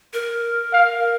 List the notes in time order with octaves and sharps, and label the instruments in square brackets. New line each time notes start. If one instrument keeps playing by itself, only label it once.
[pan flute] A#4
[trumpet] F5